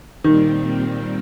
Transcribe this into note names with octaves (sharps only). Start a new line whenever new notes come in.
A#2 D#3 G3 C4